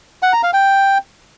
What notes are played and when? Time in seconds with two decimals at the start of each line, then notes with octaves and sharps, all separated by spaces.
0.23 F#5
0.33 A#5
0.43 F5
0.53 G5